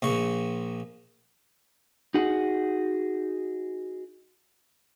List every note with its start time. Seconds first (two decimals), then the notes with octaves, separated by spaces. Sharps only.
0.02 A#1 A#2 C#6
2.14 D#4 F#4 G#4 F#5